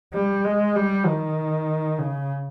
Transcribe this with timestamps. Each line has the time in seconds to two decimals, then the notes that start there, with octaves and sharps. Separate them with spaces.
0.14 G3
0.45 G#3
0.76 G3
1.06 D#3
1.99 C#3